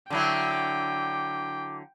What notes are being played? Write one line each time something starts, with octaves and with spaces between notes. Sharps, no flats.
D3 F#3 E4 G5 D6